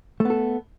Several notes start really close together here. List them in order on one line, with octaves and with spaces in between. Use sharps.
A3 B3 A4